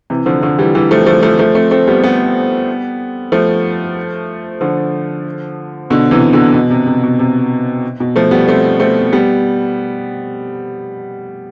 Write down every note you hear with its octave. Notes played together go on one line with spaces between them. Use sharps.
C3 E3
D3 F3
D3 F3
E3 G3
E3 G3
F3 A3
F3 A3
F3 A3
F3 A3
A3 C4
A3 C4
G3 B3
G3 B3
F3 A3
D3 F3
B2 D3
C3 E3
B2 D3
B2
C3
C3
B2
C3
B2
F3 A3
G3 B3
A3 C4
A3 C4
G3 B3